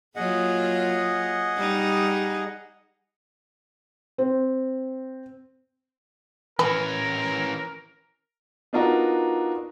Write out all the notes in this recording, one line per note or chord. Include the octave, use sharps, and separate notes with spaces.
F#3 A#3 F4 G#4 D#5 F#5
G3 D#4
C4
E3 C#4 A#4 B4
B3 D4 D#4 F4 F#4 A#4